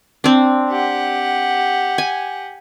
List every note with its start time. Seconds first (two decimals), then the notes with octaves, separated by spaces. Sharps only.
0.24 C4 D4
0.69 G4 F#5
1.98 G#5